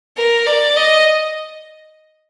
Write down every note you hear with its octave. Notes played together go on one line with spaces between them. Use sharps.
A#4
D5
D#5